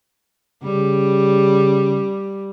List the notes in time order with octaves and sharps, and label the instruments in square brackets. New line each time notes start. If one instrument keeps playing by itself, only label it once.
[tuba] C#3 [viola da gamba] G3